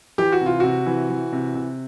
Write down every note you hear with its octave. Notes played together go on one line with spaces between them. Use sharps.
E3 G4
F#4
C3 F4
C3 F#4
E3
E3
C3
C3